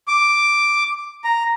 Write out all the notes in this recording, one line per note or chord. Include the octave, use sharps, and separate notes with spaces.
D6
A#5